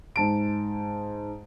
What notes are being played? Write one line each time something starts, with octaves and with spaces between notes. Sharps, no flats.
G#2 A5 D7